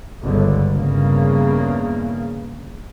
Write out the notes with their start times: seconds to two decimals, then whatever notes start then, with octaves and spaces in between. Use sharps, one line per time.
0.22 G1 C#2 D3
0.73 E2 G2 C#3 A#3